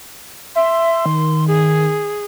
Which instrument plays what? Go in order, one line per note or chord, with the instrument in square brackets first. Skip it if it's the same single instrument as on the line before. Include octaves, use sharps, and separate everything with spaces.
[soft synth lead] E5 [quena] C6
[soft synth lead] D#3
[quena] G#4